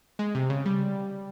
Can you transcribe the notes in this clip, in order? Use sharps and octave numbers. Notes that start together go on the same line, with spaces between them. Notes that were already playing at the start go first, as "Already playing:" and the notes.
G#3
C3
C#3
G3